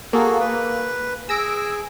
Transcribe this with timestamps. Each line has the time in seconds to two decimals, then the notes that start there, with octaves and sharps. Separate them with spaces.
0.13 A#3 F#4 G#4 A4
0.40 B4
1.29 G#4 G#5 E6 A#6 D7